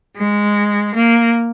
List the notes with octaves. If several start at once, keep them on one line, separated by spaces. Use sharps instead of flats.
G#3
A#3